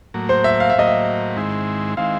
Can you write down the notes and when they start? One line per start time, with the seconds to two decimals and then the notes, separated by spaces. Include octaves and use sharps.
0.14 A2 F#3 A#3
0.29 C5
0.44 E5
0.60 F5
0.70 E5
0.75 A2 F#3 A#3 D#5
0.87 E5
1.36 G#2 D#3 G#3 C4 E4
1.97 D#3 G#3 C4 E4 F5